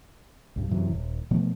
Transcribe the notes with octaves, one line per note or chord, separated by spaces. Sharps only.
B1 G2
F#2 C3 E3
D#1
B2 F3 A3 B3